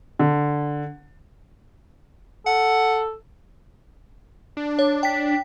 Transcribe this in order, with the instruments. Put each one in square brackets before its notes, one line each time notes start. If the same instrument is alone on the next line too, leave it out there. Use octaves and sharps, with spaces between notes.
[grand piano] D3
[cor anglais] A4 [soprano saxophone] F#5
[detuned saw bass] D4
[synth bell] C#5
G5 B6